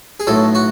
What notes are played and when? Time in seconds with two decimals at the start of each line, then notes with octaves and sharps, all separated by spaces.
0.20 G#4
0.27 B1 A2 F#3 A4
0.55 F#4